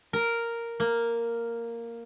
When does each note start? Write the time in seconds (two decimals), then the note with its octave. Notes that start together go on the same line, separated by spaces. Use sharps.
0.13 A#4
0.80 A#3